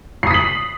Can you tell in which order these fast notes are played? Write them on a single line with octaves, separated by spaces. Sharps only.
C7 D#6 B6 F#7